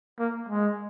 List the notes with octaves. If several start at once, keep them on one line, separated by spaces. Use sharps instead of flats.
A#3
G#3